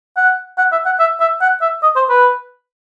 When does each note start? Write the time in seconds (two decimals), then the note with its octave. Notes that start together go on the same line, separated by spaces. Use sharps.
0.17 F#5
0.58 F#5
0.72 E5
0.86 F#5
1.00 E5
1.21 E5
1.41 F#5
1.62 E5
1.83 D#5
1.96 C5
2.09 B4